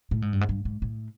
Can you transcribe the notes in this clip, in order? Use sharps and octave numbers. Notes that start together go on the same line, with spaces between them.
A2
G#2
G2
G#2
G2
G#2
A2